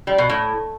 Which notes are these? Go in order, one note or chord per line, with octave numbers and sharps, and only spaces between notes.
G3
B2
A2